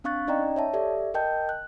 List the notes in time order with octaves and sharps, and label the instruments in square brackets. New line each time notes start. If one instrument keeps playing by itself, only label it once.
[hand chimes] C4 D4 F5 C#6 F#6 A6
C#4 D#4 D5 D#5 G5 A#5
C#5 E5 A5
G4 A4 D5 E5
A#4 D#5 G5 A5 G6
F#6